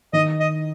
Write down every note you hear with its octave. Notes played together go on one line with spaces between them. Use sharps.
D#3 D#5
D#5